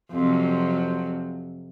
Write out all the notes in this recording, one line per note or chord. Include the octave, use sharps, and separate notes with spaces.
F2 C3 F#3